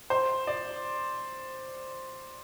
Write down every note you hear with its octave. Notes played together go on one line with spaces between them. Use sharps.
C5
D5